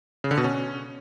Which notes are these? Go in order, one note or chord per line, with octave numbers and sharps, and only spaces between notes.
C#3
D3
B2
C#4